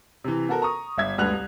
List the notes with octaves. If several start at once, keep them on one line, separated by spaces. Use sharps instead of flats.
C3 E3
B3 F#4 A4 A#4
A#5 C#6 D#6
G1 E5 G#6
D2 G2 B4 F#6 F7
C2